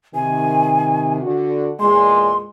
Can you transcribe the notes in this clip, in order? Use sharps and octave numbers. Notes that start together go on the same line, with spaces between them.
C3 D#3 G#5
D3 F#4
E2 A#2 G#3 C6